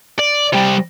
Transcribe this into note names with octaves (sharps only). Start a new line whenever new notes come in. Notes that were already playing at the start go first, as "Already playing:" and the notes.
D5
C3 G3